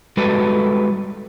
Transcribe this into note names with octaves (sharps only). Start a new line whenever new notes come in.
G3 G#3 F#4 A4 B4